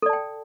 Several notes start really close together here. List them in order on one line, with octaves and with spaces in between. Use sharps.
A4 D5 A5 G5